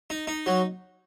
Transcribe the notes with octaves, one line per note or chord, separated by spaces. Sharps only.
D#4
D#4
F#3